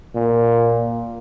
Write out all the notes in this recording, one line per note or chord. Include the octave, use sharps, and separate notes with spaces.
A#2